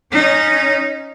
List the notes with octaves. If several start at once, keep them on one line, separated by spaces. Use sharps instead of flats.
C#4 D#4